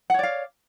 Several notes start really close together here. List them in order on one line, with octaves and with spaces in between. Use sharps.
F#5 C#5 D5 F5